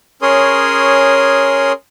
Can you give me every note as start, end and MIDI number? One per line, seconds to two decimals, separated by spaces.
0.22 1.72 61
0.22 1.72 68
0.22 1.72 70
0.22 1.72 73
0.22 1.72 84
0.22 1.72 87